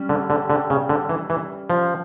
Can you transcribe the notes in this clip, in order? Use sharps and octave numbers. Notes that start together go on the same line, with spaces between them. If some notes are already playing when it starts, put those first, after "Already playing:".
Already playing: G3 C#4
D3
D3
D3
C#3
D3
E3
E3
F3